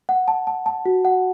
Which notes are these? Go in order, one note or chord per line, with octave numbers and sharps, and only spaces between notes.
F#5
A5
A5
A5
F#4
F#5